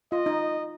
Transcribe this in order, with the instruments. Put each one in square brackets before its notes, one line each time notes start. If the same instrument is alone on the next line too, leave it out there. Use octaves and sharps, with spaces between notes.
[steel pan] F4 [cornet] D#5
[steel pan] D#4